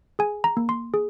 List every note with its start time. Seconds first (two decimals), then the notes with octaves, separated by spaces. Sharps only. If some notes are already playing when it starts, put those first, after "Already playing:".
0.19 G#4 G#5
0.44 A#5
0.57 A#3
0.69 C6
0.94 G#4